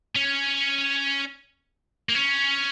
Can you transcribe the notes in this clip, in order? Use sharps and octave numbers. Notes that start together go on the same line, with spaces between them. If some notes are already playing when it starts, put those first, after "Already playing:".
C#4
A#3
C#4